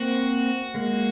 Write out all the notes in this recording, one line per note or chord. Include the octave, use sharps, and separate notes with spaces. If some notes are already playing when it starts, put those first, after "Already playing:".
Already playing: A#3 C4 F#4
G#3 A#3